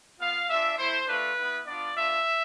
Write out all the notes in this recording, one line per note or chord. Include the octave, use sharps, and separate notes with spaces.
B3 F4 F5
G#3 D4 F4 E5
A3 E4 C5
A3 D4 F4 B4
B3 E4
B3 D4 F4 D5
A3 D4 F4 E5